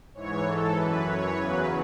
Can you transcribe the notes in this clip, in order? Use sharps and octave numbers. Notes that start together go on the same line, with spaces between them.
G#2 E3 C#5
A4
F#2 E3 B4
C#5
E2 C#3 F#3 B4